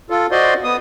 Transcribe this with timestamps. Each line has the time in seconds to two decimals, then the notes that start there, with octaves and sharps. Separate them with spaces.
0.10 F4 A4
0.31 F#4 C5 D5 D#5 C6
0.64 B3 D#6